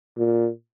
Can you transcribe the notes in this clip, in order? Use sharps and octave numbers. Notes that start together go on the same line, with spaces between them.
A#2